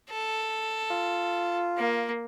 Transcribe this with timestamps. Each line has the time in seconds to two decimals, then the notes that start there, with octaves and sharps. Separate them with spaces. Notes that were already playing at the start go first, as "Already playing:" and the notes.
0.10 A4
0.91 F4
1.78 A#3